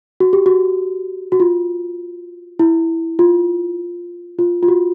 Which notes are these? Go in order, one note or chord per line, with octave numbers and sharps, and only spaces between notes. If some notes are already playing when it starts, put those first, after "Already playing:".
F#4
G4
F#4
F#4
F4
E4
F4
F4
F4
F#4